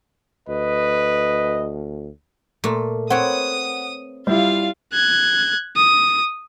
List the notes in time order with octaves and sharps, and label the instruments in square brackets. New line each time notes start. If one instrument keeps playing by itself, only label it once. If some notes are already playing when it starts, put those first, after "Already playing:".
[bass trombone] D2 [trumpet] B4 [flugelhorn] D#5
[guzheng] A#2 A3
[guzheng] C4 B4 C#5 [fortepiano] F#5 [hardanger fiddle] D#6
[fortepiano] G3 E4 [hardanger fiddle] F4 F5
[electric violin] F#6 G#6
D#6